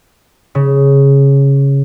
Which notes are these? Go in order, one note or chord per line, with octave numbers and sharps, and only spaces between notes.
C#3